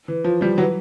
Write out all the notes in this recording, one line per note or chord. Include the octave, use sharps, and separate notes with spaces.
E3
F3
F3 G3
E3 F#3